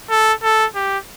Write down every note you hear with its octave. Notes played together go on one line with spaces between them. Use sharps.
A4
A4
G4